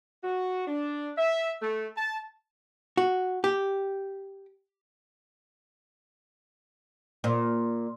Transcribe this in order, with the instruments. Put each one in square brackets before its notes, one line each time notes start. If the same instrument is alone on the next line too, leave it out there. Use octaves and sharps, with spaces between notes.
[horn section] F#4
D4
E5
A3
A5
[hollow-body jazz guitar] F#4
G4
[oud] A#2